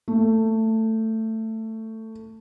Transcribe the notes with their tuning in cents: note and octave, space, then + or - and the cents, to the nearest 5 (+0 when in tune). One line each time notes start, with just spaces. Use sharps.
A3 +15